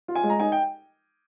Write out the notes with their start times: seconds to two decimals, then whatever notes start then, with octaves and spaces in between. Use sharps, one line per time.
0.08 F4
0.15 G#5
0.23 G#3
0.30 A#5
0.40 D#4 G#5
0.52 G5